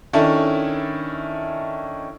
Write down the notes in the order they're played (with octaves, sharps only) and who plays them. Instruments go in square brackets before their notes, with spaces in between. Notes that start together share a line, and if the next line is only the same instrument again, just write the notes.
[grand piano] D#3 C#4 D4 E4 A4